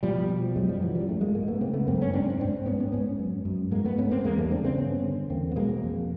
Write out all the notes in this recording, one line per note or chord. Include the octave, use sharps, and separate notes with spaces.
B2 F3 G3
B2
F#2 F#3 G#3
F3 G3
F#2 E3 F#3
F3 G3
G#2 G3 A3
G#3 A#3
G#2 G#3 A#3
A3 B3
C#3 A#3 C4
A3 B3
F#2 A#3 C4
B3 C#4
G#2 C4 D4
C#4
G#2 C4 D4
G#2 B3 C#4
B3 C#4
G#2 B3 C#4
F#2
F#2
G#2 G#3 A#3
A3 B3
G#2 B3 C#4
A#3 C4
E2 G#3 A#3
G3 A3
C#3 C4 D4
C4 D4
G2 B3 C#4
D3
E2 A#3 C4
B3
B2 G#3 A#3
F2